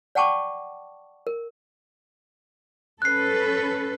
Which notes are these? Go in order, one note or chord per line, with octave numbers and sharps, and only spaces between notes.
D5 F#5 G5 A5 C#6 D6
A#4
C#4 A4 B4 F#6 C7